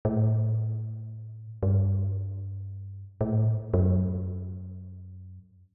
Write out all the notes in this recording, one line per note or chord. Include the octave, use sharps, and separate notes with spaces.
A2
G2
A2
F#2